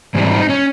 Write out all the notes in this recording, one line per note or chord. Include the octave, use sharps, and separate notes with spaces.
G#2 E3 G3 C4
D#4
C#4